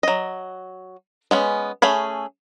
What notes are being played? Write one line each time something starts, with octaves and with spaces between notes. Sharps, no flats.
F#3 D#5
G#3 B3 C#4
A3 C#4 G#4 B5